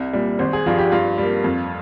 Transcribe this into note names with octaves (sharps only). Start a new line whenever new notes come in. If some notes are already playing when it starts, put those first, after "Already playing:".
Already playing: C2
A#2 G3
G#1 C5
G#4
G2 F3 F4
G4
G2 F4
G3 A#3
F2